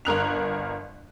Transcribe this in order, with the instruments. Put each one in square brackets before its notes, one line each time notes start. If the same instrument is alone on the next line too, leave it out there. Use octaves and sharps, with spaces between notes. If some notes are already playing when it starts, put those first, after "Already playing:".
[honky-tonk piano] G1 A#4 F#6 F7